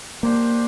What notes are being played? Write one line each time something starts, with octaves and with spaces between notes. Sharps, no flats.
A#3 D4 G4 C5